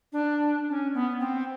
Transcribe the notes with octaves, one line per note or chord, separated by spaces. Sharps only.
D4
C#4
B3
C4